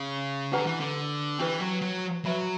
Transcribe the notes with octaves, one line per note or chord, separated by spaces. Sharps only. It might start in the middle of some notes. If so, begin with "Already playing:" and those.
Already playing: C#3
D3 D4 G4 B4 F#5 A#5
E3
D3
E3 C#4 G4 B4
F#3
F#3
F#3 B4 E5 B5